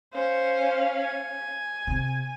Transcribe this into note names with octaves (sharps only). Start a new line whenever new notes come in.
C#4 C5 F5
G#5
C3